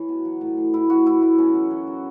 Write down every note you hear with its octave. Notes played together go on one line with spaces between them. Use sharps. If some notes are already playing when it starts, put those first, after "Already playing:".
Already playing: E3 C#5
B2
F#3
A2
E3
A2 E4
E3 F#4
A2 E4
E3 E4
B2 C#4
F#3
F#2
F#3